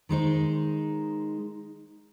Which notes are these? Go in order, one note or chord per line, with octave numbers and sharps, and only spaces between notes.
D#3 G#3 D#4 C5